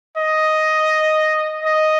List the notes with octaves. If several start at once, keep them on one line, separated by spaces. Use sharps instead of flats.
D#5
D#5